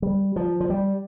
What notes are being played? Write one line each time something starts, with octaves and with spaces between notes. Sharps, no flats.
G3
F3
F3
G3